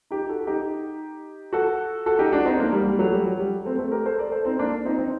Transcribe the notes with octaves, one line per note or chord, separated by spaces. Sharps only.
D#4 G4
F#4 A4
D#4 G4
F#4 A4
F#4 A4
D#4 G4
D4 F#4
C4 D#4
A#3 D4
G3 A#3
G3
F#3 A3
G3
F#3
G3
A3 C4
A3 C4
G4 A#4
A4 C5
A#4 D5
A4 C5
C4 D#4
A#3 D4
C4 D#4
C4 D#4